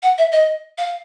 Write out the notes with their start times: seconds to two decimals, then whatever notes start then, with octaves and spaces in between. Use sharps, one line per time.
0.03 F#5
0.18 E5
0.32 D#5
0.78 F5